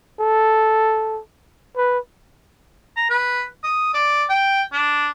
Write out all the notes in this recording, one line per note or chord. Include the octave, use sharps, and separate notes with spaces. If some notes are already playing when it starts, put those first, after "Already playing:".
A4
B4
A#5
B4
D#6
D5
G5
D4